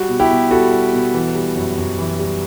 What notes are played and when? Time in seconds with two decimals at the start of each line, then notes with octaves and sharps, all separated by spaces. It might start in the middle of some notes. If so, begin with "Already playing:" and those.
Already playing: G3 F#4
0.09 B2
0.20 E4 G4
0.30 B2
0.51 G3 F#4 A4
0.72 G3
0.93 B2
1.14 E3
1.35 G3
1.56 F#2
1.78 F#2
1.98 E3
2.19 G3